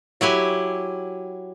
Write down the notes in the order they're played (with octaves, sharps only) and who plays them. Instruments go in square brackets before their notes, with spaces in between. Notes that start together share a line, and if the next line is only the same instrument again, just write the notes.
[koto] F#3 E4 G4 G#5